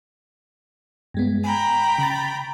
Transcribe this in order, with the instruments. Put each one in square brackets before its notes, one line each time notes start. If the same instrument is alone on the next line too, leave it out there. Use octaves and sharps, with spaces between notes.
[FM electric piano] G2 G#3 B3
[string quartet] G5 A#5 B5 [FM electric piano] G#5
[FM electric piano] C#3 A6